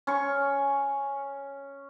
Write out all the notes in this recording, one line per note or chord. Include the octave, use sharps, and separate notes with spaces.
C#4 C#6